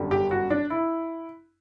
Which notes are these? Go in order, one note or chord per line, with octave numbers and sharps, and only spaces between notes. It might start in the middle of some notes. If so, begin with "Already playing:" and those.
Already playing: G1 F#2 D3 G3
G4
F#4
D4
E4